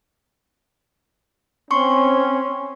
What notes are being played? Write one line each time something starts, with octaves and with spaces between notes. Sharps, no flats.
C4 C#4 C6 C#6